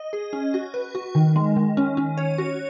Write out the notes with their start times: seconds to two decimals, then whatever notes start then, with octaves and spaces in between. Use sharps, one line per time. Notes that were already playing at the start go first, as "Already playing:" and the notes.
Already playing: D#5
0.13 G#4
0.33 C#4
0.54 F#4
0.74 B4
0.95 F#4
1.15 D#3
1.36 G#3
1.56 D#3
1.77 C#4
1.97 C#4
2.18 C#5
2.38 F#4